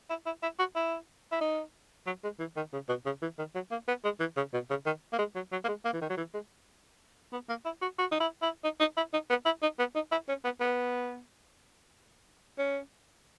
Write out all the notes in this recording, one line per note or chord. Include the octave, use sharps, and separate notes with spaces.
E4
E4
E4
F#4
E4
E4
D#4
F#3
G#3
E3
D#3
C#3
B2
C#3
E3
D#3
F#3
A#3
B3
G#3
E3
C#3
B2
C#3
D#3
A#3
G#3
F#3
F#3
A#3
G#3
A#3
E3
D#3
F#3
E3
G#3
B3
A#3
E4
F#4
F#4
D#4
E4
E4
D#4
D#4
E4
D#4
B3
E4
D#4
B3
D#4
E4
C#4
B3
B3
C#4